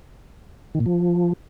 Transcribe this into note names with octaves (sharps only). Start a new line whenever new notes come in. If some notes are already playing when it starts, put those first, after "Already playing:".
D#3
A#2
F3